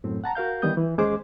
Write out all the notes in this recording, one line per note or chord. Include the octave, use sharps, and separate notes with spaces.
F#2 A2 C4
F#5 A5 A#5
F#4 A#4 F5 G6
D#3 E3 G3 B3 D#6 G6
E3
D#2 G#3 C#4 G#4 C5 D6